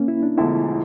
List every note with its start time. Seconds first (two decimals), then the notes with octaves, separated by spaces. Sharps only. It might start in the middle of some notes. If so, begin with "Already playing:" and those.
Already playing: A#3 C#4
0.08 E4
0.23 D4
0.38 E1 E2 D3 F3 A3 E4